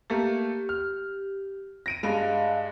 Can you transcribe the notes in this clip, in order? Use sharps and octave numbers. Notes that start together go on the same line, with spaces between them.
A3 A#3 G4 A4
F6
A#6 D7 D#7
G2 G#3 D#5 F5